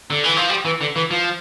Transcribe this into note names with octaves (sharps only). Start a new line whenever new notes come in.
D3
E3
F3
G3
E3
D3
E3
F3